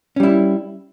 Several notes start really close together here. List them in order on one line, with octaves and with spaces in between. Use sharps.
C#4 G3 E4